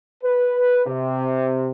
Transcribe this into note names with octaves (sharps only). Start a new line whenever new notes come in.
B4
C3